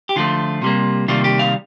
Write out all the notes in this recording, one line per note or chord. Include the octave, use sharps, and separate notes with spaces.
G4
D3 F3 A3 F4
C3 G3 A#3
C3 D#3 G3 A#3 F4
G4
F5